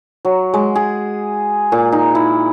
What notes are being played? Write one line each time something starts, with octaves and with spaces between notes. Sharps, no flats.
F#3
G#3
G#4
A#2
D#4
E4